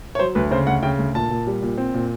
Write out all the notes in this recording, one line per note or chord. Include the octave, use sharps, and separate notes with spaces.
C#5
F#3 C5
D2 B4
C#3 C5
D2 F#5
C#3 G5
D2
A#2 A5
A#2
G3
A#2
C4
A#2